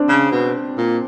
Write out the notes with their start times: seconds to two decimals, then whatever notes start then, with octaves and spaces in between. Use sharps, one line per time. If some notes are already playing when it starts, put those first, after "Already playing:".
Already playing: C4 D4
0.09 C#3
0.32 B2
0.77 A#2